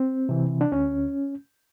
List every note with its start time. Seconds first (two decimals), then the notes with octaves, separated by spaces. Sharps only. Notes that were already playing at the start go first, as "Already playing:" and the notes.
Already playing: C4
0.29 C3 E3
0.61 D4
0.72 D2 C#4